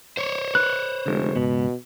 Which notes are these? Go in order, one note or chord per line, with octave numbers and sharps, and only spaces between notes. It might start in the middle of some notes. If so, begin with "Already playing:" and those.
C5 C#5
B4 F#6
F1 D3 G#3
C#2 G#2 B2 B3